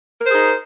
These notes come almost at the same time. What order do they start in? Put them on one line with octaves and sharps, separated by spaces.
A#4 C5 G#4 D#4